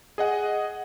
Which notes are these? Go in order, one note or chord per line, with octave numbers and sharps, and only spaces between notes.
G#4 D#5 F#5